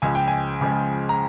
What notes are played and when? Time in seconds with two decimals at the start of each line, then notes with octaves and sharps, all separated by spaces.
0.02 C#2 C#3 F3 G#3 G#5
0.15 G5
0.28 G#5
0.61 C#2 C#3 F3 G#3
1.09 A#5